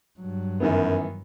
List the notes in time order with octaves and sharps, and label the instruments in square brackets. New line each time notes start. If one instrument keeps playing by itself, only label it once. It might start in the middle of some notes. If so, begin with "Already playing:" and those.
[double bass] G2 F#3
[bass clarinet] F#2 [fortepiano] D#3 E3 B3